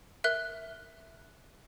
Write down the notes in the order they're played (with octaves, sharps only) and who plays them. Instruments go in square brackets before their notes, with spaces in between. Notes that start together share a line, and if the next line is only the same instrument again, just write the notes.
[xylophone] A#4 E5 F#6